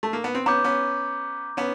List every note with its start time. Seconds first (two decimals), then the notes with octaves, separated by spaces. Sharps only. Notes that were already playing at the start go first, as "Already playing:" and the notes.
0.03 A3
0.13 A#3
0.24 B3
0.35 C4
0.46 B3 C#4 A#5 D6 G6
0.64 B3 C#4
1.57 B3 C#4